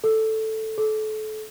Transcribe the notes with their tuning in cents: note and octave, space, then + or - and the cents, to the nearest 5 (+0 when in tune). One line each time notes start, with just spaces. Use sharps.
A4 +0
A4 -30